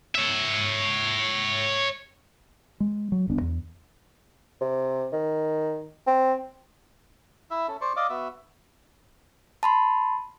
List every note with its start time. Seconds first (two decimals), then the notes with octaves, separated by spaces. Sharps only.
0.15 C#5 E5
2.80 G#3
3.12 F#3
3.27 D1 C2 B3 D4
3.41 E2
4.61 C3
5.13 D#3
6.07 C4
7.51 E4 E5
7.68 C#4 A4
7.81 C5 D5 C6 C#6
7.96 D5 D#5 F5 D6
8.10 B3 F#4 E5
9.63 A5 B5 C6